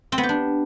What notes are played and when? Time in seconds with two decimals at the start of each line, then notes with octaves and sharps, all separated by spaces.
0.12 C4
0.18 B3
0.23 G4
0.29 D4